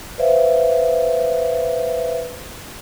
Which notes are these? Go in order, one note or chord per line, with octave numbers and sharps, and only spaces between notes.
B4 C5 D5 E5 F5